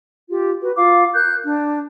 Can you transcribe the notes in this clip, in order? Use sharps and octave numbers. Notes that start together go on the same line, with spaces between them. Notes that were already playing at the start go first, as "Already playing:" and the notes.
F4 G4
F#4 B4
F4 F5 D6
A#4 F#6 G6
D4